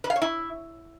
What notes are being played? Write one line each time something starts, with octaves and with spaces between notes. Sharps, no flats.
B4
F5
C#5
E4